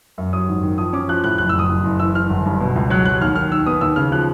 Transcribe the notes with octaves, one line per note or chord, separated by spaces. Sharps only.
F#2
F#3 D#6
G#1
D#3
F3 D#6
C#4 D6
F3 F#6
A2 F#6
F#1 F#6
E6
F#1 D#6
F#1
F#1
E3 E6
E3 F6
G1
G2
B2
C#2
F#3 F#6
F#3 F#6
D#2 F6
D#3 F6
D#3 E6
B3 D#6
D#2 E6
C#3 F6
F3 F#6